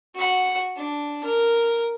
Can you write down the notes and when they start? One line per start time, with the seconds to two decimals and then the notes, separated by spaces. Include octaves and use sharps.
0.15 F#4 F#5
0.77 D4
1.24 A#4